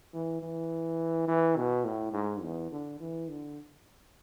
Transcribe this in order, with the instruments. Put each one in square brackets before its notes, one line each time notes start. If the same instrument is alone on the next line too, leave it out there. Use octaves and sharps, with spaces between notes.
[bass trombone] E3
E3
E3
B2
A2
G#2
E2
D3
E3
D3